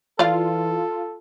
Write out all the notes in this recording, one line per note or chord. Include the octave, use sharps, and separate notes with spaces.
E3 F4 A4 D5 F5